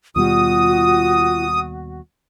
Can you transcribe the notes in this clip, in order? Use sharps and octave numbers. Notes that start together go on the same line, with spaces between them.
D#2 B2 G3 F4 F#4 D#6